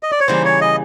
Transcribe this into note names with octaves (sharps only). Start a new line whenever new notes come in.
D#5
D5
C#5
C#3 E3 G3 A#3 C5
C#5
D#5